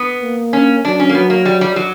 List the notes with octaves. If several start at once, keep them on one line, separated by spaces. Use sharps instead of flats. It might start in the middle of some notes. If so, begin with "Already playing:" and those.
Already playing: B3
A#3
C#4
F#3 D4
C#4
A#3
F#3 B3
A#3
G3
G3
F#3